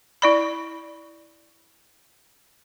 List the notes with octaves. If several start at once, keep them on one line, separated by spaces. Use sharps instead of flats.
E4 D5 B5